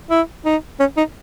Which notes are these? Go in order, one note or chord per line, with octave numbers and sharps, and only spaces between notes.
E4
D#4
C#4
D#4